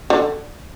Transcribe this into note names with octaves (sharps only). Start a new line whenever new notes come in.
D3